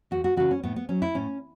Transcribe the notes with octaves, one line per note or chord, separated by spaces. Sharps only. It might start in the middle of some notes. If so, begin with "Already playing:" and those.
E2 F#4
F#4
C#3 E3 F#4
C#4
A2 B3
B3
F#3 C#4
E4
A2 C#4